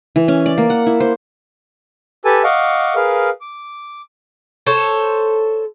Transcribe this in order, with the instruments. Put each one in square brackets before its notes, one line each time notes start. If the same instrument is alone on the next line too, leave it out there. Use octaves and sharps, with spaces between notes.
[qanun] E3
C#4
D5
A#3
F#5
E4
C5
[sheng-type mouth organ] G4 A4 B4 G#5 A5
D#5 F5 F#5 C#6 D6
G#4 A#4 B4 F5
D6
[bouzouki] A4 C5 C#5